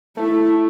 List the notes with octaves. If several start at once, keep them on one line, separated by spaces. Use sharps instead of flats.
A3 E4